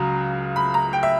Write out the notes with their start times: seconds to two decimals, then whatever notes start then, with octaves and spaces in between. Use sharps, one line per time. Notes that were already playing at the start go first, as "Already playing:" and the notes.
Already playing: C#2 C#3 F#3 A#5
0.56 B5
0.74 A#5
0.93 G5
1.03 E5